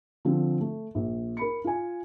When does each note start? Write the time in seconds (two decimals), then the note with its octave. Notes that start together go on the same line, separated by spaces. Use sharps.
0.25 D3 F3 C4
0.61 A3
0.95 A#1
1.37 A#4 B5 C#7
1.64 F4 G#5